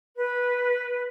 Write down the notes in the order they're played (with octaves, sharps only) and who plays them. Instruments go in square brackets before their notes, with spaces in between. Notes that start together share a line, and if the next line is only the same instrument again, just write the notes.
[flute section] B4